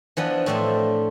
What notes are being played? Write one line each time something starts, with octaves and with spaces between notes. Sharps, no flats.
E3 F3 B3 D4
A2 F3 A3 C4 D4 E5